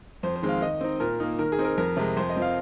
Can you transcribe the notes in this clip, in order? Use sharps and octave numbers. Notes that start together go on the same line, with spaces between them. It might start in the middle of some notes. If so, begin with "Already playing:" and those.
F2 C5
C5
D#3 G#3 C4
F5
D#3 D#5
C4 D#4
A#2 A#4
A#3 D#4
D#3 A#4
G#4
C4 D#4
A#4
F2 A#4
C3 G#3
F2 C5
D#5
F3 C4
F5